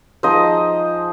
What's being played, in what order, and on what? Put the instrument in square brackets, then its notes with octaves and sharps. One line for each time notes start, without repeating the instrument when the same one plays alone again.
[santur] F3 G#3 D#4 C5 D#5